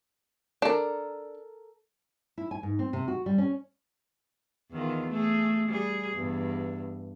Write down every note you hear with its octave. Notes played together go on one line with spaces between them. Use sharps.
D4 A4 A#4
E4
G#5
G#2
C4
C3
F#4
G3
C#4
E2 D#3 F4
A3 G#4
G3 G#4
E2 G2